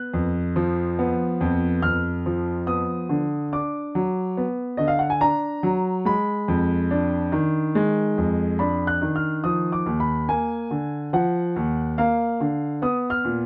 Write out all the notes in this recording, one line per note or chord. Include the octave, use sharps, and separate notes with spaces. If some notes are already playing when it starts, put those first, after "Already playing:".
Already playing: B3 F#6
F2
F3
B3
F2
F2 F6
F3
B3 D#6
D3
D4 D6
F#3
B3
D3 D#5
F5
F#5
G#5
D4 A#5
F#3
G#3 B5
F2
D4
D#3
G#3
F2
D4 B5
F#6
D#3
F6
F3 D#6
D6
D#2
B5
A#3 G#5
D3
F3 F#5
D#2
A#3 F5
D3
B3 D#6
F6
A#2